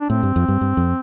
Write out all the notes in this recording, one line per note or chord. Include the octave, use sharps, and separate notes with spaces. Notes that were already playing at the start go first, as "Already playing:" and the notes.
D4
A2 C4
G2
F2
G2
G2
F2